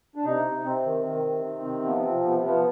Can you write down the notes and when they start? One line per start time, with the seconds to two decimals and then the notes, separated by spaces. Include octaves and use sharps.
0.16 D4
0.25 C3 D#4
0.44 C3
0.65 C3 C4
0.85 D#3
1.04 D#3
1.24 C3
1.44 D#3
1.64 C3
1.84 F3 B3
2.04 F3 C4
2.24 C3 B3
2.44 F3 B3